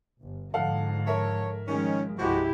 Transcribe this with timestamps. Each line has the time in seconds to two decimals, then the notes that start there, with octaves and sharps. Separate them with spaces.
0.20 G1
0.54 G#2 D3 F3 A4 F5 F#5
1.07 A4 A#4 C#5 E5
1.67 D#3 F3 G#3 C#4
2.19 C2 G2 F3 G#3 E4 F#4 G4